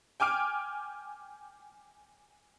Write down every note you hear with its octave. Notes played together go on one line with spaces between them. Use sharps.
G5 G#5 D6 F6 D7